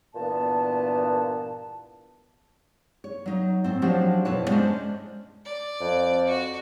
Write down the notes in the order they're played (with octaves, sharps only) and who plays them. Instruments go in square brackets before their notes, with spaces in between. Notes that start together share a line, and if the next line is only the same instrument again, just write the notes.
[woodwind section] G2 A#2 E3 B3 A5
[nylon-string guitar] C#5
F#3 D#4
A2 C4
F3 F#3 D4 D#4 F#4 G4
F2 B2 E4 B4 C#5 A5
G#3 C#4 D4 C5
[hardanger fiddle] D5
[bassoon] F2
[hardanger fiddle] F#4